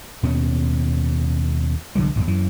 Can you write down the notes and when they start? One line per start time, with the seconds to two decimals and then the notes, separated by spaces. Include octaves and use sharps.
0.23 D#2 B2 C#4
1.95 C2 D3 F#3 G#3
2.16 D1 D#2
2.28 F#2 E3